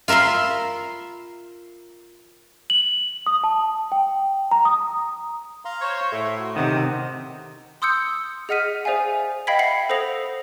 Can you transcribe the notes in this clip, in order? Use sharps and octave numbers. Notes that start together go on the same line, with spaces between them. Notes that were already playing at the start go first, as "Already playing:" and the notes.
F4 A#4 E5 B5 C6
F#7
D#6
A5
G5
A#5
D#6
F5 A#5 C6
C5 C#5
A2 E5 C6
F#4
C3 D#3 C5 F#5
C6 D#6 E6 G6 C#7
G#4 D#5 F#5 F6 B6 D#7
G#4 C5 D5 E5 F5 G#5
D#5 F5 G5 B5 G#6 B6
E5 F#5 B5 C7
A4 C5 F5 D#6 A#6 F7